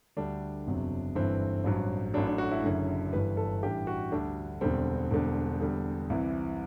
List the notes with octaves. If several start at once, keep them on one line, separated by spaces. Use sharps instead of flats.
D2 D3 G3 D4
F#1 E2 C3 F#3
G1 G2 E3 C4
A1 G2 F#3
A1 A2 F#3 D4
D4
F#4
E4
F#1 F#2 D3 F#3
G1 G2 E3 G3 B4
A4
A1 G2 E3 G4
F#4
D2 D3 G3 D4
E1 E2 D3 G3 C4
E1 E2 D3 G3
E2 D3 G3
C2 C3 E3